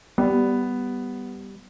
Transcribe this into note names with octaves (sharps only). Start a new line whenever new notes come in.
G3 B3